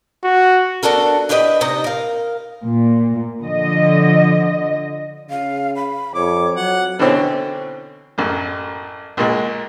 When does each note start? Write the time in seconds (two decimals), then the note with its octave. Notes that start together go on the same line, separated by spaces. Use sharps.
0.24 F#4
0.83 B3 D4 F#4 A4 A#4
1.29 D4 E4 G4 B4 D5 D#5
1.61 C3 D#4 D#5 A#5
1.84 A#4 F5
2.64 A#2
3.44 D3 F3 D#5
5.30 C#3 F5
5.76 B5
6.15 F2 C#5 D6
6.57 F#3 F#5
6.99 B2 D3 E3 C4 C#4
8.18 A1 F#2
9.17 A#1 A#2 G#3